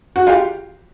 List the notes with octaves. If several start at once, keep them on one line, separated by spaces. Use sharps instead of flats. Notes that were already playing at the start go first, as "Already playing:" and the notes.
F#4
F4 G4